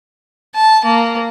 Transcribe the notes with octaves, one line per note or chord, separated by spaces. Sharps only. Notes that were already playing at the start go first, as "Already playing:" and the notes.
A5
A#3